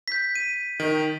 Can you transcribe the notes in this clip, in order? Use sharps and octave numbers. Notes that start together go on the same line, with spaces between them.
G6 B6
D#7
D#3